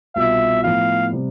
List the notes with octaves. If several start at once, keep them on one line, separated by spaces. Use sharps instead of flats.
C2 B2 B3 F4 E5
A2 F3 B3 E4 F5
C3 G3